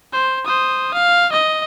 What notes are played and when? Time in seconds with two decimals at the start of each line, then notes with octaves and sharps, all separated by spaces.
0.13 C5
0.45 C5 D#6
0.94 F5
1.32 D#5